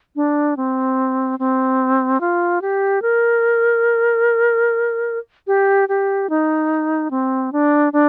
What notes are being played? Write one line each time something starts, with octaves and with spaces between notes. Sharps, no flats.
D4
C4
C4
F4
G4
A#4
G4
G4
D#4
C4
D4
D4